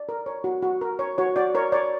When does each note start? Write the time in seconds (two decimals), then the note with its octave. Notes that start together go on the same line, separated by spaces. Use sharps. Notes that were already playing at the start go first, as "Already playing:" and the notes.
Already playing: D5
0.09 A#4
0.26 C#5
0.44 F#4
0.62 F#4
0.81 A#4
0.99 C#5
1.18 F#4 C#5
1.36 F#4 D5
1.55 A#4 C#5
1.72 C#5 D5